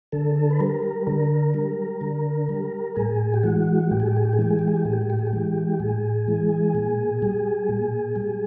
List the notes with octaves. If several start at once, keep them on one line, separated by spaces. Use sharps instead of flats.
D3 A4
A4
B4
G3 A#4
A#4
D3 A#4
G3
D3
G3
A2 G#4
G4
E3 G#3 F#4
A2 G4
G#4
G4
G#4
G4
G#4
E3 G#3 G4
G#4
G4
G#4
G4
A2 G#4
G4
G#4
G4
G#4
G4
E3 G#3
A2 G#4
E3 G#3
A#2
G3
A#2
G3